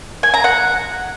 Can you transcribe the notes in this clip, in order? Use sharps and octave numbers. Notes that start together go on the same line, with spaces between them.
G#5
A#5
F#5